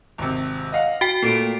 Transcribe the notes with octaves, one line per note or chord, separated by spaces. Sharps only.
G#1 C3
D#5 F5 F#5
F#4 G5 B6
A#2 A3 C7 D7